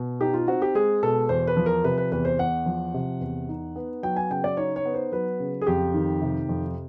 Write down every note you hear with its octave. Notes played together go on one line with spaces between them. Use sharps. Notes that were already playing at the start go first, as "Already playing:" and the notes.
Already playing: B2
D#4 G4
F4
C4 F#4
G4
G#3 G#4
B2 A4
E2 C5
B4
F3
A#4
C3 B4
B4
E2 B4
C5
E2 F#5
F3
C3
E2
D#4
B3
F#3 G5
G#5
C#3 G5
D5
D#4 C#5
C#5
B3
C5
F#3 B4
C#3
G#4
F2 G4
D#3
C3
F2